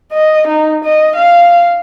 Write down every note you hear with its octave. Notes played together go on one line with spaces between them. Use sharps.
D#5
D#4
D#5
F5